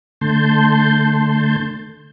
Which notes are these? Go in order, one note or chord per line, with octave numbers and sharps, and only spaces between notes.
D3 A3 A5 C6 G6